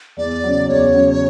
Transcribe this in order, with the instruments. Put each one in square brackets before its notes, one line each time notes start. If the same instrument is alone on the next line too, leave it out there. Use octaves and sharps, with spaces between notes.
[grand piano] E2 [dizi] D5
[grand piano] C#3 F#3
[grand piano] E2 [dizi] C#5
[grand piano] C#3 F#3